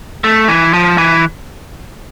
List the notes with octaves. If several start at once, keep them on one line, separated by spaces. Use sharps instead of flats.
A3
E3
F3
E3